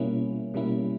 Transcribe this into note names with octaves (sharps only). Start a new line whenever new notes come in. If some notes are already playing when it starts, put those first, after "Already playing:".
Already playing: B2 G3 A#3 C#4 E4
B2 G3 A#3 C#4 E4